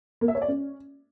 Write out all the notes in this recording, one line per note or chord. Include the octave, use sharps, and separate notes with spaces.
A#3
E5
C#5
D5
C#4